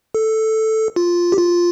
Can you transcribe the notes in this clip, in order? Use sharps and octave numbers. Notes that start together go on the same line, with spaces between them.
A4
F4
G4
F4